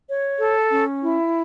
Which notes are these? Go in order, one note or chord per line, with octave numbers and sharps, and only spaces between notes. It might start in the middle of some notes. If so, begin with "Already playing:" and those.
C#5
A4
C#4
E4